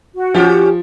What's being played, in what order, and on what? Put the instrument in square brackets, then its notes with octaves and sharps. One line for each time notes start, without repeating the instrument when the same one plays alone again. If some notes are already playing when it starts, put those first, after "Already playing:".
[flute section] F#4
[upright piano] F3 [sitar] C#4 G4